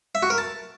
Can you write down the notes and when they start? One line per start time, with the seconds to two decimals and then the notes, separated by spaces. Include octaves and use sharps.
0.15 E5
0.23 F#4
0.30 A#4
0.38 A5